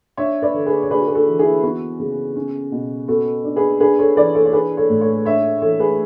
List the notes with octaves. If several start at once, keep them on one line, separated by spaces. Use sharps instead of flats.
D4 C#5 E5
B4 D5
D3
G#4 B4
C#5
D4 G#4 B4
F#4
G#4
F#4 A4
E3
E4 G#4
B3 F#4
C#3
C#4
B2
B3 F#4 A4
D4
G#4 B4
D4 G#4 B4
A4 C#5
E3 B4 D5
A4 C#5
C#5
D4 G#4 B4
A4 C#5
A2
A4 C#5
D4 C#5 E5
E3 A4 C#5
G#4 B4